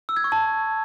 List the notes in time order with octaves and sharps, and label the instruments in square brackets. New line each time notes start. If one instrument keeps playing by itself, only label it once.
[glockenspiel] E6
G#6
C#6
A5